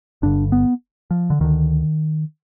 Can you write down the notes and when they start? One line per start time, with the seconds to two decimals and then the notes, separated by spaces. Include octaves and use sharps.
0.22 G1 G2 D3 D4
0.52 B3
1.11 F3
1.30 D3
1.40 D2 D3 D#3